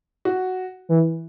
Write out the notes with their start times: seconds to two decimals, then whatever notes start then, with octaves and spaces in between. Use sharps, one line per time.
0.25 F#4
0.89 E3